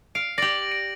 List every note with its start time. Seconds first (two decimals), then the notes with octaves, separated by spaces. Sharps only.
0.15 F5 D7
0.38 G4 D5 A#6 D7 F#7
0.72 D7